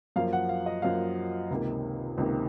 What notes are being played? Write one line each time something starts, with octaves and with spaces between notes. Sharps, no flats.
F#2 F3 A#3 F5
F#5
F5
D#5
F#2 F3 A#3 F5
C#2 C3 D#3 A#3
C#2 C3 D#3 A#3